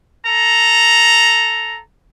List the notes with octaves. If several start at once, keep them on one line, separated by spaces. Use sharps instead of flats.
A4 A#5